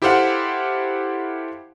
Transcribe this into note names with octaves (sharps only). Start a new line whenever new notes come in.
E4 G4 A4 C5 F5 F#5